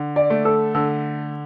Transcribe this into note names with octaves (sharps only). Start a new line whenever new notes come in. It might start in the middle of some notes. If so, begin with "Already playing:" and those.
Already playing: D3
D5
A3
A4
D3 A4